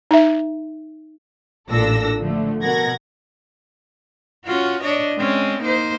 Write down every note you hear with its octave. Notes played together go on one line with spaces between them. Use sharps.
D#4 E5
A1 A#2 D4 A4 E6 A#6
D3 F3 A3
B2 A#4 F#5 G#6 A#6
C#4 F4 F#4
D4 C#5 D#5
G#3 C4 C#4
A#3 D#4 C5